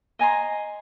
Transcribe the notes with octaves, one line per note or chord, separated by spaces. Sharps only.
D#5 G#5 A#5 C6